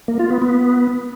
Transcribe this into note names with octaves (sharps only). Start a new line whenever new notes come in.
A#3
F4
B3
B3